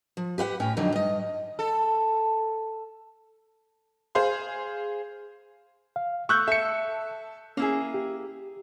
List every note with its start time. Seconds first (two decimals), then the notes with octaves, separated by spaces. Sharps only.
0.17 F3
0.38 G4 B4 F5 F#5
0.60 A2 C#4 G5
0.77 F2 D3 F#3 D#4
0.93 G2 D#5
1.59 A4
4.15 G#4 C5 F5 C6
5.96 F5
6.29 A3 C#6 E6 F#6 G6
6.48 A4 E5 C#7
7.57 A#3 C#4 E4 G#4
7.94 G4